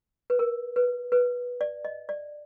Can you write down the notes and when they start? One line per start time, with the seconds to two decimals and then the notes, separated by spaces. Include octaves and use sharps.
0.30 B4
0.39 A#4
0.76 B4
1.12 B4
1.61 D5
1.85 D#5
2.09 D5